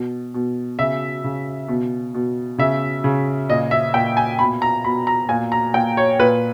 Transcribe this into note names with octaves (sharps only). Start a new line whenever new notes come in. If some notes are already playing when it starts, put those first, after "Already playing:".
Already playing: B2
B2
C#3 E5
C#3
B2
B2
C#3 E5
C#3
A#2 D#5
E5
A#2 G5
G#5
B2 B5
A#5
B2 B5
A#5
A#2 G#5
A#5
A#2 G5
C#5
A#2 B4